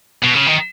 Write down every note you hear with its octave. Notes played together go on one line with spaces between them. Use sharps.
B2
C#3
D#3